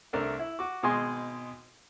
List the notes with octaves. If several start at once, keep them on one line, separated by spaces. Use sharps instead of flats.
C2 A3 D4 A#4
E4
F#4 D6
G#1 B2 G#3 D#5 G#5 C6